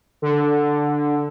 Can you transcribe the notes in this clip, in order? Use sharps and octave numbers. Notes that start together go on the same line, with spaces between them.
D3